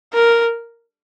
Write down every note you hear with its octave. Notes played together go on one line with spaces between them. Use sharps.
A#4